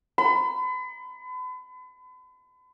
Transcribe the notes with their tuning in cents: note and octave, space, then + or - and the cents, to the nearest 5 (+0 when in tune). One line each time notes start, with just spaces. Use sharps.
B5 +40